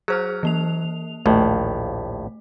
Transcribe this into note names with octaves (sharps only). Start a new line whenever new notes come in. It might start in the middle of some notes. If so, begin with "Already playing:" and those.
F#3 G#4 C5 F6
E3 A#3 F7
A#1 D#2 A2 A3